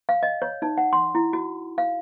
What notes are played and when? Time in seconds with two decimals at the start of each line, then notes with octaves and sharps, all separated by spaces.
0.09 F5
0.23 D#5
0.42 C#5
0.62 D#4
0.78 F#5
0.93 C6
1.15 E4
1.33 F#4
1.78 F5